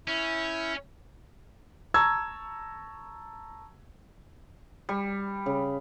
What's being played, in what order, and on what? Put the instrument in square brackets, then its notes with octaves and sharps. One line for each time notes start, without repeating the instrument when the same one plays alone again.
[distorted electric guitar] C#4 [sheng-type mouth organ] E4 G6
[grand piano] A5 A#5 C#6 E6 G#6
[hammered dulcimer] G3
C#3